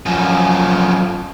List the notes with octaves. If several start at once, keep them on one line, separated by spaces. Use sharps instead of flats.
F#2 F3